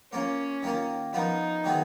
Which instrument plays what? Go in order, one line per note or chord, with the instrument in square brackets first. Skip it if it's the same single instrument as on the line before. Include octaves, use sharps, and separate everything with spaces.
[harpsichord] A#3 F4 A#4 [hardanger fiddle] C#4
[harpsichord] D#3 A#3 F4 A#4
[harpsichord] F3 B3 F4 A#4 [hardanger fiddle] D#4
[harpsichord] D#3 F#3 B3 F4 G#4